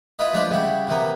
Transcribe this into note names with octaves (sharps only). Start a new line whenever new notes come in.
E4 F4 B4 D#5
F3 G#3 D4 B4 D5
C#3 G3 E4 F#4
C3 E3 A#3 B3